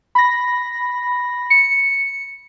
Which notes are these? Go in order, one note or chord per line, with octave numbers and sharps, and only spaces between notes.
B5 A#6
C#7